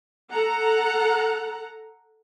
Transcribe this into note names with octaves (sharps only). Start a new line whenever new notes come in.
A4 F#5 A#5